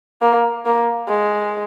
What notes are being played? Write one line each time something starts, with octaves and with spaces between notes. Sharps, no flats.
A#3
A#3
G#3